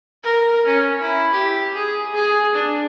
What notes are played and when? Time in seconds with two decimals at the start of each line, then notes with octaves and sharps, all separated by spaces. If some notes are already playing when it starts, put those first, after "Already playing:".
0.24 A#4
0.66 C#4
1.01 E4
1.32 G4
1.74 G#4
2.14 G#4
2.55 D4